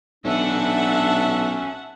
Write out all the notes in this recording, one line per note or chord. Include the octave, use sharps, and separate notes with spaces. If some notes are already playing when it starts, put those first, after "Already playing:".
B1 C#4 D4 A4 E5 F#5 A5